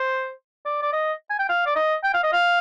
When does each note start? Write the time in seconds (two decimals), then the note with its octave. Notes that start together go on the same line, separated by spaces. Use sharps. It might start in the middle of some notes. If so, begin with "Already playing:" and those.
Already playing: C5
0.65 D5
0.82 D5
0.93 D#5
1.30 G#5
1.39 G5
1.49 F5
1.66 D5
1.76 D#5
2.03 G5
2.14 F5
2.23 D#5
2.32 F5